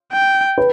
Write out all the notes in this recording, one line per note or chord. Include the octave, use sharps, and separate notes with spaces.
G5
B4